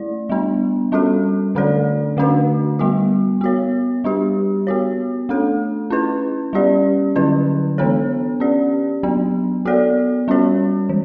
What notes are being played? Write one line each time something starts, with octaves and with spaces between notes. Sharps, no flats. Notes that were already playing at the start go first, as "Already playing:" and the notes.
Already playing: A3 E4 D5
G3 B3 D4
G3 C#4 F#4 A4
D3 A3 D4 A4 D5
D3 A3 D4 F#4 B4
G3 B3 F#4
B3 F#4 C#5
G3 D4 G4
B3 F#4 C#5
A3 D4 A4
C#4 E4 B4
G3 C#4 G4 D5
D3 F#3 C#4 E4 B4
E3 B3 D4 A4 C#5
C#4 G4 D5
F#3 B3 D4
B3 F#4 A4 D5
G3 C#4 F#4 C#5
E3